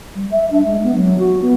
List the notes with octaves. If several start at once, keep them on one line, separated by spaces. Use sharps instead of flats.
G3
E5
D4
G#3
B3
F#3
F#4
B3